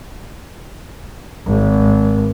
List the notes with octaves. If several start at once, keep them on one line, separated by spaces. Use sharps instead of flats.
G#1